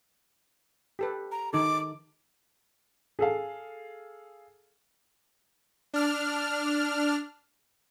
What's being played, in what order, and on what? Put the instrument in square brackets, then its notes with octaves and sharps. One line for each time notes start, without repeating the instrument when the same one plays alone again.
[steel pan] G4 A4 B4
[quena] A#5
[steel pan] D#3 D#4 A4 [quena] D6
[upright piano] G#4 A4 F5
[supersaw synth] D4 F6